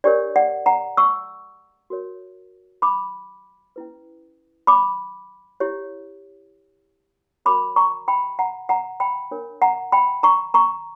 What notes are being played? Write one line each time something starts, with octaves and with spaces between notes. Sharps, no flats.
D4 G4 A#4 C#5 D5
D5 F#5
F#5 A#5
C#6 E6
F#4 A#4 C#5
B5 D6
C#4 E4 B4
B5 D6
E4 G4 C#5
F#4 A#4 C#5 B5 D6
A#5 C#6
G5 B5
F#5 A#5
F#5 A#5
G5 B5
D4 A#4 C#5
F#5 A#5
G5 B5
A#5 C#6
A#5 C#6